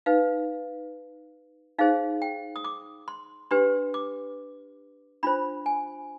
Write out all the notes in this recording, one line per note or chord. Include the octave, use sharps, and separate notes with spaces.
D#4 B4 F5
D#4 G#4 C5 F5
G5
D#6
D6
C6
D4 G4 B4 C6
D6
D4 F4 C5 B5
G#5